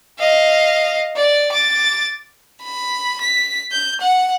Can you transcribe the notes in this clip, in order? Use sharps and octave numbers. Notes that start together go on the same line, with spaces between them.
D#5 F5
D5
D6 A6
B5
B6
G6
F#5